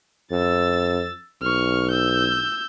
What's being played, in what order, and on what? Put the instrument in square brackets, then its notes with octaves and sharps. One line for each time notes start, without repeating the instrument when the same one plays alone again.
[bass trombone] F2 [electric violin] E6 A6
[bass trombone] B1 [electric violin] C#6 F6
[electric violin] E6 G6